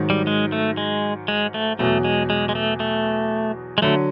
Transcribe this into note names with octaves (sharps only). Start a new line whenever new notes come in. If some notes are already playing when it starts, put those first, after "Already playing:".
Already playing: G#2 D#3 F#3
G3
G#3
A3
G#3
G#3
A3
E2 B2 F#3 A3
G#3
G#3
G#3
A3
A3
G#3
D3 F#3 A3